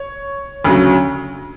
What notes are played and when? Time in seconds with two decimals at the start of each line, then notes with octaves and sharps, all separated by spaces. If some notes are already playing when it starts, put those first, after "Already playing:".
Already playing: C#5
0.64 D2 C#3 F#3